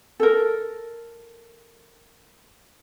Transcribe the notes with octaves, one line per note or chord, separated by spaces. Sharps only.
A4 A#4